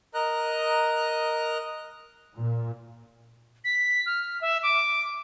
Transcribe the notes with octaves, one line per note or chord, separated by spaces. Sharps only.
A#4 D#5 A#5 F#6
A#2
B6
F6
E5
D6